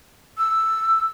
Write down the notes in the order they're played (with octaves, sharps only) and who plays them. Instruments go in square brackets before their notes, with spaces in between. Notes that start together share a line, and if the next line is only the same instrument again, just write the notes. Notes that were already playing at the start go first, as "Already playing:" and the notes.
[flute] E6